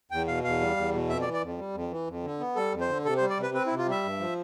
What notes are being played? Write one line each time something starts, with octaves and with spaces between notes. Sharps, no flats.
E2 G5
B2 F5
E2 F5
G3
E2
B2
F2 E5
D5
E3
D5
F2
G3
F2
E3
F2
D3
B3
G3 A4
F2
C5
D3
C3 A4
C5
G3
D5
C3
B4
C4 B4
E4
C3
F4
G3 E5
G2
F3